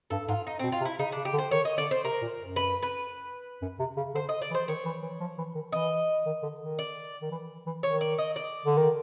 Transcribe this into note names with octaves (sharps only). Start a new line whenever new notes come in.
G2 A4
G#2 F4
D#4
B2 C4
F4
C3
E4
C#3 D#4
D4
C#3
G4
D3
C5
D#3 C#5
D#5
D3 D5
C5
C3 A#4
A#2
F#2
B4
B4
F#2
C3
C#3
D3 C5
D#5
D5
E3
C5
D#3 C#5
E3
E3
F3
E3
D#3
E3 D#5
D#3
D3
D#3
D5
D#3
E3
E3
D#3 C#5
D5
D#5
D5
D3
D#3